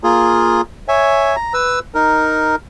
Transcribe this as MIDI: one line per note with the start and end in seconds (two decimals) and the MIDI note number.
0.04 0.61 58
0.04 0.61 65
0.04 0.61 68
0.88 1.36 73
0.88 1.36 76
0.88 1.36 80
1.36 1.53 82
1.54 1.79 71
1.54 1.79 88
1.94 2.55 63
1.94 2.55 70